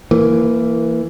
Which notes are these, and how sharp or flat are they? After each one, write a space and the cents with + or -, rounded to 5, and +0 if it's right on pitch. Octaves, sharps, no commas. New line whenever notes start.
E3 +10 A#3 -10